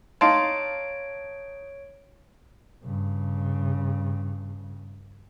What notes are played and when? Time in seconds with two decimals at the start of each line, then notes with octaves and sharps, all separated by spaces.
0.21 D#4 C#5 F5 A5 C6 D7
2.84 G2 C#3